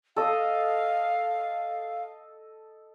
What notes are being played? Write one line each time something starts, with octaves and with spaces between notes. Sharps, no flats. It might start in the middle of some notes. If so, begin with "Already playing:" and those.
A4 D#5 F5